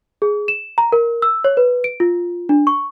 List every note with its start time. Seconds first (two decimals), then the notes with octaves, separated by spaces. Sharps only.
0.22 G#4
0.48 E7
0.78 A#5
0.92 A#4
1.22 E6
1.45 C#5
1.57 B4
1.84 D7
2.00 F4
2.49 D4
2.67 C#6